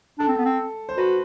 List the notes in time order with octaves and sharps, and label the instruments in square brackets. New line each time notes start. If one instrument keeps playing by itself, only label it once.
[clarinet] D4 [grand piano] A4
[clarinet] C4
B3
C4
[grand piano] C5
[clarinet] F#4 [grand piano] B4